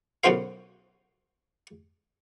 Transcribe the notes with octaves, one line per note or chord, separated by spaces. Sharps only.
B1 F#2 C#4 F#4 C5 F5